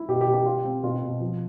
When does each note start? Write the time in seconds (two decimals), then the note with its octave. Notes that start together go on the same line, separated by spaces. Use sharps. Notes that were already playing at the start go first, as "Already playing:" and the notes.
Already playing: E4
0.09 B2 G4
0.21 G4
0.27 B2
0.34 G4
0.46 F4
0.65 C4
0.83 B2 F4
1.03 B2
1.21 F3